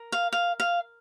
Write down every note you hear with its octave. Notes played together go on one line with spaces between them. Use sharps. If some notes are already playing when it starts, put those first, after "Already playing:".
Already playing: A#4
F5
F5
F5